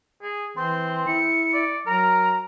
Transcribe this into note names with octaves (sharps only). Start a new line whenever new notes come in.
G#4
E3 C4 C6
E4 C#7
D5
F#3 A#4 A#5